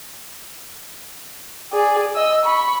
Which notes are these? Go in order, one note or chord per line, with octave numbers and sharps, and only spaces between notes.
G#4 D5
D#5 E6
B5 C#6